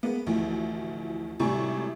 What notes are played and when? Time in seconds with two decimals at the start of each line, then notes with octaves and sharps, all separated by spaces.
0.03 G#3 A#3 B3
0.26 A1 D2 E3 F3
1.40 G#1 A2 C3 G3 G#5 C#6